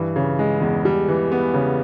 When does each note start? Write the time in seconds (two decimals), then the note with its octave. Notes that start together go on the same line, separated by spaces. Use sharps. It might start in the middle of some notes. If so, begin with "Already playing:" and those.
Already playing: G2 E3
0.16 C#3
0.39 G#3
0.61 E2
0.85 G3
1.09 E3
1.32 B3
1.54 C#3